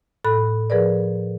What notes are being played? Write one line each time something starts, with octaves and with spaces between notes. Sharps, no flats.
A2 A4 B5 F#6
F3 G#4 A#4 B4 D5